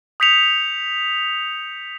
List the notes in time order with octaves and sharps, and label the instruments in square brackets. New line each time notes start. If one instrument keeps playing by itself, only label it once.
[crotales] D#6 G6 B6 C#7 F7